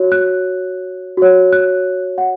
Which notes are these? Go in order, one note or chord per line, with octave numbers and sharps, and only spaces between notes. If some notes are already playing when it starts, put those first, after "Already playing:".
Already playing: F#4 C#5
F#6
F#4 C#5
F#6
F#5